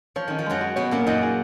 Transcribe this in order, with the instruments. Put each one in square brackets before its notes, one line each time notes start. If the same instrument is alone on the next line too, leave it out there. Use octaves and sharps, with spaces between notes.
[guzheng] F3 [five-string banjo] C#5
[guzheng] D#3 [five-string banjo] C#4
[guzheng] F3
[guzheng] F#2 F#3 [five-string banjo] G#3
[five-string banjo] F#4
[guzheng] B2 B3 [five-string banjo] C#5
[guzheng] A#2 A#3 [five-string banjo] C#4
[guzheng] F#2 F#3 [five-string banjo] D#4
[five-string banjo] G#4